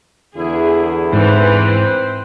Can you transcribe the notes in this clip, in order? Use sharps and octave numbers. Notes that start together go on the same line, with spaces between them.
E2 D3 E4 G#4
G#2 E3 C4 B4 C5